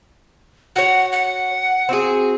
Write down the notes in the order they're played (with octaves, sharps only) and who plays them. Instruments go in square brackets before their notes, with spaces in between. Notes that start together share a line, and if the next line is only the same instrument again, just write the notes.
[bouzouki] F#4 C#5 [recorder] F#5
[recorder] F#5
[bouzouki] C4 F#4 G#4